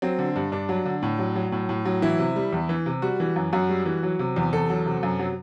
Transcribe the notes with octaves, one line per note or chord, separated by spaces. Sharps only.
F#3 C4
D3
G2
G2 D4
F#3
D3
A2
F#3
F#3
A2
A2
F#3
E3 E4
C3
G3
E2
E3
C3
G3 F#4
E3
F#2
F#2 F#4
G3
E3
F#3
C3
E2
E2 A4
F#3
C3
F#2
F#3